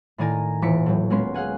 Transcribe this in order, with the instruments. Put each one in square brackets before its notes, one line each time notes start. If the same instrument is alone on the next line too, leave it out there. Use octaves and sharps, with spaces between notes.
[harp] A2 D#3 D5 G#5 A#5
D#1 E3 D6 B6 C#7
A2 F#3
G#3 A#3 B3 C#4 C6
G#4 F5 F#5 G#5